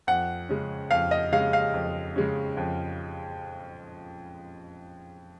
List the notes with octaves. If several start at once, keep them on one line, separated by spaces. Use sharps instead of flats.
F2 F#5
C#3 G#3 C#4
F2 F5
D#5
C#3 G#3 C#4 F5
F5
F2
C#3 G#3 C#4
F2